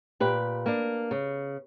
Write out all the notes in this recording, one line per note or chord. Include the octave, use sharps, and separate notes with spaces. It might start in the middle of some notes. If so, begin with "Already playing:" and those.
A#2 G4 B4
A#3 D4
C#3